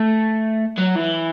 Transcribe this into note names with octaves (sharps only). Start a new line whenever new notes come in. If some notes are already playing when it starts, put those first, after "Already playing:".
Already playing: A3
F#3
E3